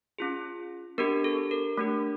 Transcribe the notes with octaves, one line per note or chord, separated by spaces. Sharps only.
C#4 F4 G#4
B3 D4 G4 A#4
A4
A#4
A3 D4 G4